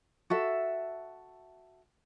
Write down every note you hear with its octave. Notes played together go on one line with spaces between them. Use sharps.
F#4 A4 E5